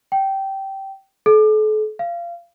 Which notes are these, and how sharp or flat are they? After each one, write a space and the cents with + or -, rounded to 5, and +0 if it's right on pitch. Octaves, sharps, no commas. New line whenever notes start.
G5 -15
A4 -40
F5 -25